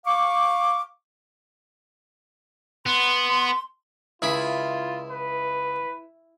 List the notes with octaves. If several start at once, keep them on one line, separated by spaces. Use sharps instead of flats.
F5 C#6 D6
B3 C6
C#2 E4 F4 G#4 B5
B4